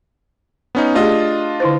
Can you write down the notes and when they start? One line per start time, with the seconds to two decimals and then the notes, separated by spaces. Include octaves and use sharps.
0.75 B3 C#4 D#4
0.95 A3 D4 F4 G4 G#4 D#5
1.60 D3 E4 C5